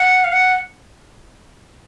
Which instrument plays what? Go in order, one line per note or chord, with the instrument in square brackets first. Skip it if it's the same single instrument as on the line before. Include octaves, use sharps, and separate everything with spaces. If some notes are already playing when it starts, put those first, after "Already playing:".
Already playing: [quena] F#5
F5
F#5